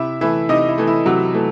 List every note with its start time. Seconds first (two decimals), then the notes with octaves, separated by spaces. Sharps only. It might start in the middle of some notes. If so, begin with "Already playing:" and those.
Already playing: C3 E4 E5
0.21 E3 A3 E4 E5
0.49 C3 D#4 D#5
0.68 E4
0.78 E3 A3
0.87 E4
1.06 C3 F#3 F#4
1.34 E3 A3